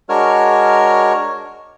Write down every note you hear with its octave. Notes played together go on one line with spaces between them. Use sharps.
G#3 D4 F#4 A#4 C#5 F6